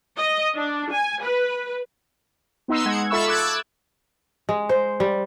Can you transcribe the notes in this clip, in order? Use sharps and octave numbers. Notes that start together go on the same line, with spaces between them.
D#5
D4
G#5
B4
B3 D#4 C6 E6
G#3 F#5 G#6
F4 A4 E5 B5 C#6 E6
D6 E6 F#6 G#6 A6
G#3
C5
G3